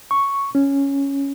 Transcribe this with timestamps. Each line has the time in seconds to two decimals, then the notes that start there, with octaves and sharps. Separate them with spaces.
0.11 C#6
0.55 C#4